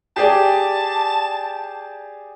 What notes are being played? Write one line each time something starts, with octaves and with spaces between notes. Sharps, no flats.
G4 G#4 D5 A5